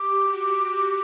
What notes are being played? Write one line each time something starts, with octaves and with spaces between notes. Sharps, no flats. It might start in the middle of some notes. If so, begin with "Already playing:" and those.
Already playing: G4 D6
F#4